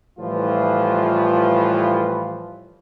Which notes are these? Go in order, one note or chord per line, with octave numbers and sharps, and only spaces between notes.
A2 E3 F3 G3 F4 B4